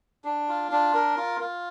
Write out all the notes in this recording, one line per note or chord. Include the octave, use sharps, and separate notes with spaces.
D4
F4
D4
A#4
F4
F4